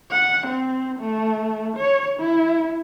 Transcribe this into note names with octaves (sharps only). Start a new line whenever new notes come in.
F#5
C4
A3
C#5
E4